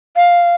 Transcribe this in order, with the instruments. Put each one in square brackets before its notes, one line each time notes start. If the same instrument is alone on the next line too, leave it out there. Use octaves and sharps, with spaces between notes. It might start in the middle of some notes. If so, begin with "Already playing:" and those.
[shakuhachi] F5